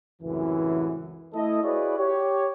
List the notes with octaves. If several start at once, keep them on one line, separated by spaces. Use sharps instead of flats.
C#2 F#2 A2 C3 E3
A3 E4 A4 D#5
E4 F#4 G#4 B4 C#5 D5
G4 C#5